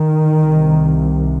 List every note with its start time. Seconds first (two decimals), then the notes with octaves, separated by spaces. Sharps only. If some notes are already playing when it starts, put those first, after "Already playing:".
Already playing: D#3
0.43 C2 C3